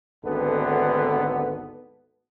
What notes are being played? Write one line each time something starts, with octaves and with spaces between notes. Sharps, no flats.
G#1 D2 D3 B3 A4 B4